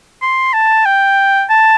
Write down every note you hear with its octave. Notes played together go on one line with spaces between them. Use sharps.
C6
A5
G5
A5